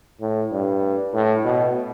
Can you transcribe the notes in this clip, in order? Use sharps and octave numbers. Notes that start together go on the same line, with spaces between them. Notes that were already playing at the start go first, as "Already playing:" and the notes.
A2
G2
A2
B2